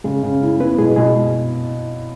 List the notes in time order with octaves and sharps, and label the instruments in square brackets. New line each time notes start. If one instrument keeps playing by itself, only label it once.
[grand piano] C#3 [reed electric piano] G#3 G#4
[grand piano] C#3
E4
[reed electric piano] B3 B4 [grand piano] E4
[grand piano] B2 [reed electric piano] G#3 G#4
[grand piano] B2 [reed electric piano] G#3 G#4